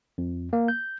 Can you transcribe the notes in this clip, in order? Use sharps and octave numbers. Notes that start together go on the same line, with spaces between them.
F2
A#3
G6